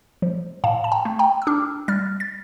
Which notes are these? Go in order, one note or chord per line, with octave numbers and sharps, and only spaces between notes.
F3
A2 F5 A5
A5
G5 A#5
A3
G5 A#5
E6
D4 D6 F6
G3 F6 A6
A6